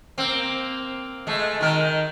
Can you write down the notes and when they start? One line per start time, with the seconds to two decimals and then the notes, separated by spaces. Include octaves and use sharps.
0.18 A#3 C4
1.27 G#3 A3
1.61 D#3 A#4